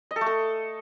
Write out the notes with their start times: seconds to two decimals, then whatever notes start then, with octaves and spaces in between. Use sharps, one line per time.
0.11 D#5
0.16 A4
0.21 A3
0.26 A4